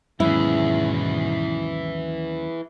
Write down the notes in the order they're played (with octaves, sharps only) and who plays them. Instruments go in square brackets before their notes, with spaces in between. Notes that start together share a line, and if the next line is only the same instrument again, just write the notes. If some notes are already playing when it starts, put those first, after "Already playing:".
[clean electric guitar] D#2 F#3 C#4 [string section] G#2 B2 [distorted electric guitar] E3 G#4 [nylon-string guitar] E4